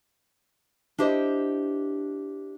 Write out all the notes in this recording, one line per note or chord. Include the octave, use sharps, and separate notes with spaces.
D4 E4 G4 C5 D#5